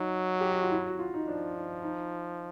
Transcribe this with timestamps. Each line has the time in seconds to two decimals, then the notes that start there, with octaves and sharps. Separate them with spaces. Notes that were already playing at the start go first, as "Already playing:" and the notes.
Already playing: F#3 D#4
0.41 G4
0.52 F#4
0.62 F4
0.71 E4
0.86 F#4
0.99 F4
1.14 D#4
1.27 F3 D4
1.55 D#4
1.82 D#4